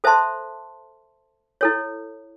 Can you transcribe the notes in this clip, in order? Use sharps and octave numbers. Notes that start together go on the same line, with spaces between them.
A4 C5 E5 A5 C6
E4 A4 C#5